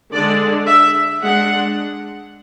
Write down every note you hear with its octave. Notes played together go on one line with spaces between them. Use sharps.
D3 G#3 D4 D5
E5
G#3 D4 F#5